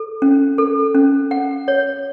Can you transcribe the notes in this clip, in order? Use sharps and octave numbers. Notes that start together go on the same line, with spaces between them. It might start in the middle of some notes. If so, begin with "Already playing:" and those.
Already playing: A4
C#4
A4
C#4
F#5
C#5